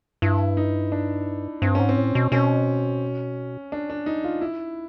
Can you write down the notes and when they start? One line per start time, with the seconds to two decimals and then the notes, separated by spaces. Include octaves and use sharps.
0.22 G2 E4
0.57 D#4
0.92 D4
1.62 G2 C4
1.75 G#2 C#4
1.89 C4
1.97 A2
2.15 B2
2.32 B2 C#4
3.72 D4
3.90 D4
4.06 D#4
4.24 F4
4.41 E4